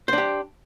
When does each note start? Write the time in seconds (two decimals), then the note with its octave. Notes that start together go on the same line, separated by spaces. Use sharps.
0.08 C5
0.13 D4
0.18 G4